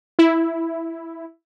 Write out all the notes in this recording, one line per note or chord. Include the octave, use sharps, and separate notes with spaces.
E4